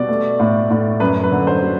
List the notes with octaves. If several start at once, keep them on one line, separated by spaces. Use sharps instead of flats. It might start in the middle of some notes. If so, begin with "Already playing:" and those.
Already playing: B2 G3 D5
A3
A2
A2
F#2 B4
B4
D3
C5
F#3